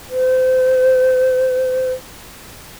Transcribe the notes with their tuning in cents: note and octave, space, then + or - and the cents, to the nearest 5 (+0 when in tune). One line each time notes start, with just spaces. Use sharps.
C5 -30